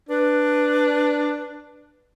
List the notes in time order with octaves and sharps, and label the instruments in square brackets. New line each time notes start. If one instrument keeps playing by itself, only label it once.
[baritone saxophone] D4 [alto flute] B4